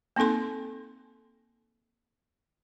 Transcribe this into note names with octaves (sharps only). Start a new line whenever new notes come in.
A#3 C4 D#4 A4 C6